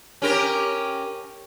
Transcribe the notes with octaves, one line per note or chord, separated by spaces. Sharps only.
C#4 G4 A#4